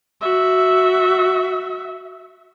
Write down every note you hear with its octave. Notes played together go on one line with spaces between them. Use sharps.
F#4 E5